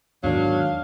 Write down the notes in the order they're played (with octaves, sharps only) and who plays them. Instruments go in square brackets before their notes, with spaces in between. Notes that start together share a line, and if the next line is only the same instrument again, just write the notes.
[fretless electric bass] E2 G#2 D#3 [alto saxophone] F#3 [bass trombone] D4 [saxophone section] F5